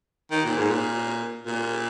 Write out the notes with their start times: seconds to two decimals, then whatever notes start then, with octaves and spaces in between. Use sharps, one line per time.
0.31 D#3
0.45 A#2
0.57 G#2
0.70 A#2
1.47 A#2